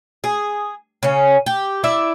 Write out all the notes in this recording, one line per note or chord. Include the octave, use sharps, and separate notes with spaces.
G#4
C#3 C#4
G4
E4 D5 E5